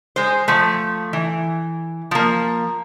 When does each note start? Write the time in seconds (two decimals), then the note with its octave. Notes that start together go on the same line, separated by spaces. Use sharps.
0.16 G#3 C5
0.48 F3 A3
1.13 E3
2.11 F3 A#3